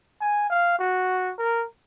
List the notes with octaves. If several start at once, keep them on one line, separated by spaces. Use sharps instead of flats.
G#5
F5
F#4
A#4